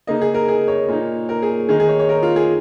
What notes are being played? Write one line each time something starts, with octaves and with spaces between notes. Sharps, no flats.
C#3 A#3 D#4 D#5
G#4
A#4
G#4
C#5
A#2 A#3 D#4
A#4
G#4
D#3 G#3 D#4 G#4
G#4
C#5
C#5
A#4
F4
G#4